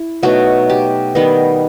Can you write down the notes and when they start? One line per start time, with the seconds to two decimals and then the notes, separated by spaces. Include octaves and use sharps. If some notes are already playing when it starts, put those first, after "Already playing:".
Already playing: E4
0.23 B2 F#3 A3 D#4 F#4
0.70 G4
1.15 D#3 G3 B3 D#4